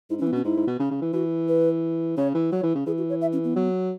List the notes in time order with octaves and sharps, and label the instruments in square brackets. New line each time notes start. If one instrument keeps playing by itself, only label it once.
[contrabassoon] G#2 [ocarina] E4
[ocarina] C#4
[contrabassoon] E3
[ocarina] B3
[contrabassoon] B2 [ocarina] C#4
[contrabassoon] G#2 [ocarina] E4
[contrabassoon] G#2
B2
C#3
C#3
E3
[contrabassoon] E3 [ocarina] F#4
[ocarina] B4
[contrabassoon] C#3 [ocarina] C#5
[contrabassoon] E3
[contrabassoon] F#3 [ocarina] C#5
[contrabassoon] E3
C#3
[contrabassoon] E3 [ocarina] G#4
[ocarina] F#4
C#5
E5
C#4
B3
[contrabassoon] F#3